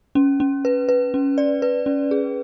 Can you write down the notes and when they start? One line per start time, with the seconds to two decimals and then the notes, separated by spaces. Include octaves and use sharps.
0.15 C#4
0.40 C#4
0.65 B4
0.89 B4
1.14 C#4
1.38 D5
1.62 B4
1.86 C#4
2.11 G#4